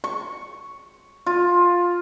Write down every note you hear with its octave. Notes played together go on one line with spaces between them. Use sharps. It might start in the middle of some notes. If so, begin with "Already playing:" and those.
C#6
F4